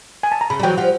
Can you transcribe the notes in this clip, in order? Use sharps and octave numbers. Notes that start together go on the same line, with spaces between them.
G#5
A5
A#5
C#3 B5
G3
E3 F#3 G5
F3 G3 F#5